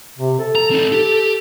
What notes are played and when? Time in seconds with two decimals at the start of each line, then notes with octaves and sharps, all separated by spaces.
0.19 C3
0.39 A4
0.55 A#5
0.71 C4 D#4
0.92 G4